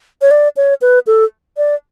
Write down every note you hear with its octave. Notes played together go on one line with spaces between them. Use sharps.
C#5
D5
C#5
B4
A4
D5